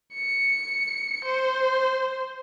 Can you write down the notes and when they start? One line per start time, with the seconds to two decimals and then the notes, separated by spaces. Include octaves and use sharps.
0.14 C#7
1.25 C5